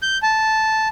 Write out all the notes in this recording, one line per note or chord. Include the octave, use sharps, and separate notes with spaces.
G6
A5